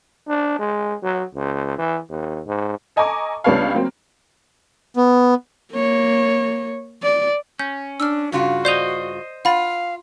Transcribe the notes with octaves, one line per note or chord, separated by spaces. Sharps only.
D4
G#3
F#3
C#2
E3
D#2
G#2
A4 D#5 G#5 A#5 C#6 D6
C#2 G3 B3 D4 C#5 F5
F#3 A#3 C4
B3
A#3 C#5
D5
C#4 G6
D4 E6 F6
G2 C#3 F4 F#4
C5 D5 D#5 G6 F7
F4 F5 F#5 B5 A6